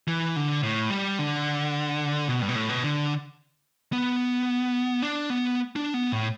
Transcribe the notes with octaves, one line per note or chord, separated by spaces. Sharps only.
E3
D3
A2
G3
D3
B2
G2
B2
A2
B2
D3
B3
D4
B3
D4
B3
A2